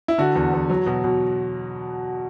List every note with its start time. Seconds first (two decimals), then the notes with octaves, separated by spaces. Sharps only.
0.08 E4
0.18 D3 F#4
0.36 E2
0.53 E2
0.70 F#3
0.86 B2
1.04 B2